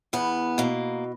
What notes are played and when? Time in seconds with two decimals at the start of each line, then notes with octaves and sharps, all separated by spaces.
0.13 E2 B3
0.58 B2 A#3